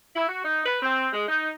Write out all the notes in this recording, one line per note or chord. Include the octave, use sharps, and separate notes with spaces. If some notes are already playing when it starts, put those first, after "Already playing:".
E4
F#4
D#4
B4
C4
G#3
D#4